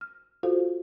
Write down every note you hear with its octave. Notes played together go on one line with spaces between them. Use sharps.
F6
F4 F#4 A4 C5 F5